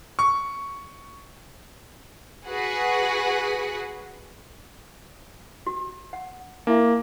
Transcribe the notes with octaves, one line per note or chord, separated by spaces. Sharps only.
C#6
F#4 G#4 B4 F#5
F#4
F#5
A#3 D4 E4 E5